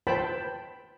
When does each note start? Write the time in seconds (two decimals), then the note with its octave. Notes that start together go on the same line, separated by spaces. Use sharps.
0.07 B4 C5 G5 A5 B5